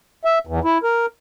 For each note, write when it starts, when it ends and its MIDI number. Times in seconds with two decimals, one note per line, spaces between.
0.25 0.39 76
0.47 0.59 40
0.64 0.78 64
0.84 1.06 70